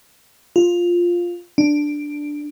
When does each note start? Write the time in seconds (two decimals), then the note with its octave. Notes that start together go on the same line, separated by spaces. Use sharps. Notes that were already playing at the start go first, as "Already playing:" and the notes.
0.56 F4
1.58 D4